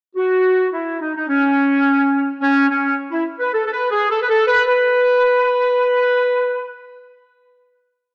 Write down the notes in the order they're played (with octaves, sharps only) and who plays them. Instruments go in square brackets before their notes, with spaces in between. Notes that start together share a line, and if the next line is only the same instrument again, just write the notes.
[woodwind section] F#4
E4
D#4
D#4
C#4
C#4
C#4
E4
B4
A4
A4
B4
G#4
A4
B4
A4
B4
B4